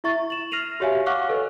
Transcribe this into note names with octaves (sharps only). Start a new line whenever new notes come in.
E4 E5 C#6 A6
E7 F#7
F6 A#6 C7 D#7 F7
F#4 G4 C#5 E5 F5 G#5
F5 F#5 C#6 D6 F6 F#6
A4 B4 C#5 D#5